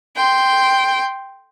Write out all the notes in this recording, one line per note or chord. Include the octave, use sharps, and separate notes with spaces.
G5 C6